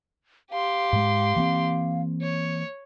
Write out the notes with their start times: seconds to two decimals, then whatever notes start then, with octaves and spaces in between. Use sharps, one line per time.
0.51 G4 F5 C6
0.93 G#2 G#3
1.36 E3 A#3 C4
2.22 C#5